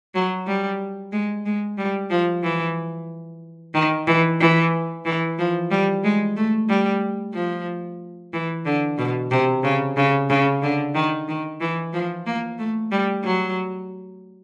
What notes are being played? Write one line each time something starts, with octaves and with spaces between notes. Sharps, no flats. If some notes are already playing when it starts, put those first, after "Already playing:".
F#3
G3
G#3
G#3
G3
F3
E3
D#3
E3
E3
E3
F3
G3
G#3
A3
G3
F3
E3
D3
B2
C3
C#3
C#3
C#3
D3
D#3
D#3
E3
F3
A#3
A3
G3
F#3